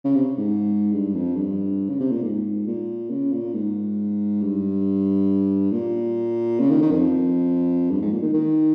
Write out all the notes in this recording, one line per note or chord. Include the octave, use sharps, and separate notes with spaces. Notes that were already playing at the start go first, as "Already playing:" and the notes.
C#3
C3
G#2
G2
F2
G2
C#3
C3
A#2
G#2
A#2
C#3
A#2
G#2
G2
A#2
C#3
D#3
D#3
F2
G2
G#2
A#2
D#3
D#3